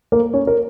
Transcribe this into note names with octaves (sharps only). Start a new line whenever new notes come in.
A#3 A#4
C#4 C#5
A#4